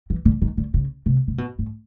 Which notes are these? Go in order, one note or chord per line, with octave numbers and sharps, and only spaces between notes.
E3
D3
D#3
D3
C#3
C3
C3
B2
A2